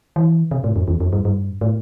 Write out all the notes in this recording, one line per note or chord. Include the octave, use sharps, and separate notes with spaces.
E3
C3
A2
F2
E2
F2
G2
G2
A2